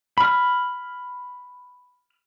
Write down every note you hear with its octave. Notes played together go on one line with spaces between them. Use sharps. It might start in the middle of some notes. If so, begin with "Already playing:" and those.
B5 F6